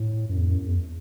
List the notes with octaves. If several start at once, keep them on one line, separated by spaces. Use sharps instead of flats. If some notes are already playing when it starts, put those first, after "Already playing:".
Already playing: A2
F#2
E2
F#2
E2